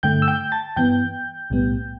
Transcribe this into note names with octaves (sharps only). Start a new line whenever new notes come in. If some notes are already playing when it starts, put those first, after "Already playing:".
G2 D3 A3 G5 G6
E6
G5 G6
A5 A6
G2 E3 B3 G5 G6
B1 A2 G3 B3